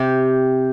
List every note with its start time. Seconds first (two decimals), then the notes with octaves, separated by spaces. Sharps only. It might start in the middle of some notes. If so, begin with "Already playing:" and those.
Already playing: C3 G4